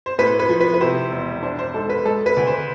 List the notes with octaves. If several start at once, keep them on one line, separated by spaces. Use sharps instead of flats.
C5
A2 B4
B4
F3
B4
B4
C3 C5
E1
D4 C5
C5
G#2 A4
B4
G#3 A4
B4
D2
C5